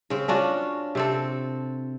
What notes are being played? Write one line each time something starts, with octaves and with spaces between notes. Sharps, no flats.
C#3 C4
C#4 D4 F4 F#4
C3 C4 A4